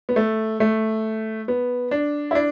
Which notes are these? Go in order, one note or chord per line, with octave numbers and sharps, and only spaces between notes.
B3
A3
A3
B3
D4
E4
D4